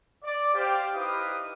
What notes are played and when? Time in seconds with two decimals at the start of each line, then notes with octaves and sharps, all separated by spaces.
0.24 D5
0.55 G4 C5 F5
0.94 D#4 E4 G4 B4 F5 D#6